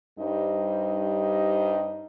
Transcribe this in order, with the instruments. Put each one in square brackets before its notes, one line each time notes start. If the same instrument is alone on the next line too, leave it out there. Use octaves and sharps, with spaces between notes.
[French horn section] G2 G3 D#4 C5 D#5